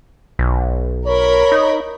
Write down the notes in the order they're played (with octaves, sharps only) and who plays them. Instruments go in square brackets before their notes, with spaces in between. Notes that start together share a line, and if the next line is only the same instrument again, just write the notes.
[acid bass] B1
[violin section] A#4 B5 [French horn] C#5
[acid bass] D#4